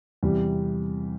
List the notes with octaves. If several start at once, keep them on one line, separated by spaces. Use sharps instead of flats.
E2 C3 G3